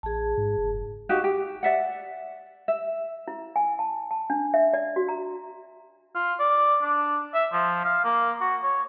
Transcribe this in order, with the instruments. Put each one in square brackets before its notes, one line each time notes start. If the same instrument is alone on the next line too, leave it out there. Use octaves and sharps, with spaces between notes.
[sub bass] A1 [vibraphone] G#4 A5
[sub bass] G#2
F#1
[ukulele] D#4 F#4 G4 F5
G4
D5 E5 F#5
E5
[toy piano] E4
G#5
A5
A5
D4
E5
D5
F#4
A#5
[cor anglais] F4
D5
D4
E5
F3
F5
A#3
F#4
C#5